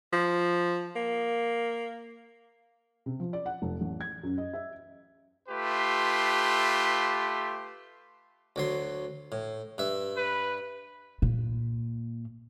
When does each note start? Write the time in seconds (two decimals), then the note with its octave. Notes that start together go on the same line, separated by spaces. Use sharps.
0.13 F3
0.96 A#3
3.06 C3
3.20 F3
3.33 D5
3.46 F#5
3.62 F1
3.81 A1
4.01 G#6
4.23 F#2
4.38 D#5
4.53 E5
5.49 A3 F4 G4 B4 C6
8.56 D2 F#3 C6
9.32 A2
9.78 G2 E5
10.17 B4
11.22 A#2